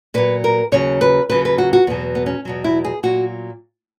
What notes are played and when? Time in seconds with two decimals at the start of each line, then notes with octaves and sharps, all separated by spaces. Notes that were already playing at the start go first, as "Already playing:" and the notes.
0.14 A#2 F#3 B4
0.44 A#4
0.72 D#2 C#3 F#3 C#5
1.01 B4
1.30 D#2 C#3 F#3 B4
1.45 B4
1.58 F#4
1.73 F#4
1.87 E2 B2 F#3 B3
2.15 B3
2.26 C#4
2.45 E2 B2 F#3
2.64 E4
2.84 G#4
3.03 A#2 F#3 F#4